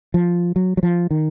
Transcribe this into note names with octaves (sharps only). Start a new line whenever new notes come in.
F3
F#3
F#3
F3
D#3